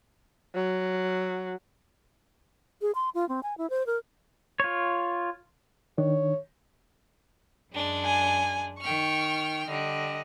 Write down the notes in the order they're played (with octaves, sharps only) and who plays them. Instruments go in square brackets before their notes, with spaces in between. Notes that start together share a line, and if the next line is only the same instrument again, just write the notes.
[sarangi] F#3
[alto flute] G#4
C6
F4
C4
G#5
E4
C5
A#4
[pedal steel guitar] F4 C#5
[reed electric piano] D#3 D4 [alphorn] C#5
[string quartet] F#2 G#3 D4
[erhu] G#5
[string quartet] D#3 G5 F6 [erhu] C#6
[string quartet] D3 G3 [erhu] D#5